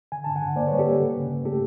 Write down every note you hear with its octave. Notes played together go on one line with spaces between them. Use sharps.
D3 G#5
D3 A5
F#5 G#5
D3
A#3 C5 D5
G3 B4 C#5
G4 A4
A#3
C#3
C#3
C#3
A3 G4 A4